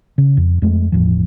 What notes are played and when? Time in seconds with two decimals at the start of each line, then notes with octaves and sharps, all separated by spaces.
0.18 C#3
0.37 F2
0.62 F2 G#3 A3
0.92 G1 E2 A2 F3